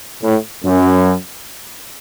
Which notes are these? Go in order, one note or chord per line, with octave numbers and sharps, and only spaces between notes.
A2
F#2